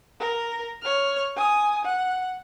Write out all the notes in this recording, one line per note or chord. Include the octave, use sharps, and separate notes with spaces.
A#4
C#5 F6
G#5 D#6
F#5